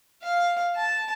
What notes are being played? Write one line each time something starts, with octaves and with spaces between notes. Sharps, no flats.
F5
A5